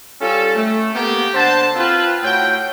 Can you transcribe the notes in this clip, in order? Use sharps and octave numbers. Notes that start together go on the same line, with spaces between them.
G3 C#4 F4 A4
A3
A#3 B3 G4
D3 C5 F#5 A5
C4 F4 B4
A2 F#4 C#5 G5